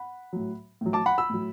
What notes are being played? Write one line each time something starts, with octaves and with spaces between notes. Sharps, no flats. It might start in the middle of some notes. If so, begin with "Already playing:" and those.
Already playing: F#5 B5
A2 F#3
A2 F#3
A5 D6
F#5 B5
B5 E6
A2 F#3